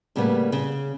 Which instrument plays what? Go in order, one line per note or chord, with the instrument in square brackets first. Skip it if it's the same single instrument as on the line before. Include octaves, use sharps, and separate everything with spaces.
[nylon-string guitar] A2 C#3 G3 A#3 B3
C#3